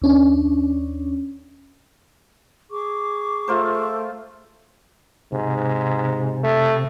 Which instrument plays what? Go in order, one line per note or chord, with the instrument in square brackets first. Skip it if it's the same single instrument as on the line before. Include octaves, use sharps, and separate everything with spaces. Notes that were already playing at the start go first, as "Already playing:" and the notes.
[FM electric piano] D#2 C#4 D4
[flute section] G#4 C#6 D6
[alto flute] A3 [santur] F4 A#4 C5
[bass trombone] G#2 [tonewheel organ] C3
[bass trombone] A3